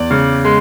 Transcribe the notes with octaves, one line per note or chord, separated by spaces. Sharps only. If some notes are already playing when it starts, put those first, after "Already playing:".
Already playing: E2 D5
C#3
G#3